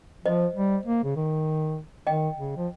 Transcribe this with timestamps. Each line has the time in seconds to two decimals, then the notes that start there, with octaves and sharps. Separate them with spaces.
0.25 F3 C5 D#5
0.56 G3
0.86 A#3
1.04 C#3
1.16 D#3
2.07 D#3 D#5 G5
2.38 C#3
2.57 F3